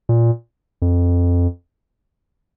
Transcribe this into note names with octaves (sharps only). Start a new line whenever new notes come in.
A#2
F2